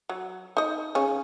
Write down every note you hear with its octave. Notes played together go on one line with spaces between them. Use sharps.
F#3
D#4 D#5
C#3 C#4